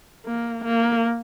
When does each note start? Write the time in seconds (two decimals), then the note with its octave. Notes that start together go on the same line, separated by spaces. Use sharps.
0.26 A#3
0.65 A#3